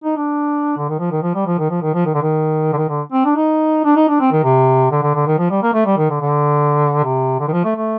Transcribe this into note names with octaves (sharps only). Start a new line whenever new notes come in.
D#4
D4
D3
D#3
F3
D#3
F3
G3
F3
D#3
F3
D#3
F3
D#3
D3
D#3
D3
D#3
D3
C4
D4
D#4
D4
D#4
D4
C4
D#3
C3
D3
D3
D3
D#3
F3
G3
A#3
A3
G3
D#3
D3
D3
C3
D3
D#3
F3
A3
A3